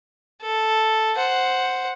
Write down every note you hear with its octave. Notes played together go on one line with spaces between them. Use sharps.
A4
C5 F#5